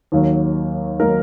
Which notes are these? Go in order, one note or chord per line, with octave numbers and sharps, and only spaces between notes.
D#2 D#3 F#3 A#3 D#4
D#3 F#3 A#3 D#4 A#4